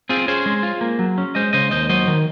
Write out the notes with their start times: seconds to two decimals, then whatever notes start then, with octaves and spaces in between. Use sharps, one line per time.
0.09 C4 F4 G#4
0.28 C#4 G#4 C5
0.46 G#3
0.63 F4
0.81 A#3
0.99 F#3
1.18 C#4
1.35 G#3 C5 D#5
1.53 C#3 C5 D#5
1.71 D#2 C5 D#5
1.89 F#3 C5 D#5
2.08 D#3